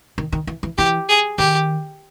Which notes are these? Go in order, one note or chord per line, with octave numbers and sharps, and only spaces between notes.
D#3
D#3
E3
E3
E3 G4
G#4
D#3 G4